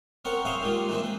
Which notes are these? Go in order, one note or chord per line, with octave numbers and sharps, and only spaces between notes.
B3 C4 A#4 C#5 F#5
G#4 C5 C#5 E5 F5 G#5
D#3 G3 G#3 A#3 F4
D#3 E3 G#3 A#3 C4 E4
B4